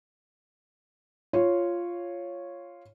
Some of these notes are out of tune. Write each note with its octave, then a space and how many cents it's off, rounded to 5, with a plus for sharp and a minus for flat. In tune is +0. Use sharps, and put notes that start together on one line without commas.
F4 -5 C#5 -5